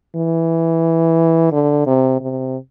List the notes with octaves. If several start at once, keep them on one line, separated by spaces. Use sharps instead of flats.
E3
D3
C3
C3